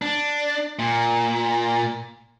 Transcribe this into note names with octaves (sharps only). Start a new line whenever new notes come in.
D4
A#2